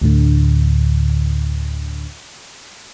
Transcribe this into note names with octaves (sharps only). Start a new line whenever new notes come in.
D2 A2 D3